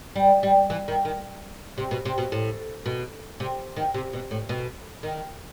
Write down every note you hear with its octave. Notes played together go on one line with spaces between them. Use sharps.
G3
G3
E3
D#3
D#3
C3
B2
C3
B2
A2
B2
C3
D#3
C3
B2
A2
B2
D#3